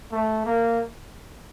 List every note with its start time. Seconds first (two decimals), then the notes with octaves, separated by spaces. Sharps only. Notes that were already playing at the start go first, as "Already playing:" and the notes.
0.12 A3
0.45 A#3